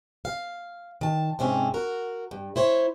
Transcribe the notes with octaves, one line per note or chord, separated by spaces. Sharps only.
F5
D#3 A5
G#2 C3 C4 C#4
F#4 A#4
G2
E4 C5 C#5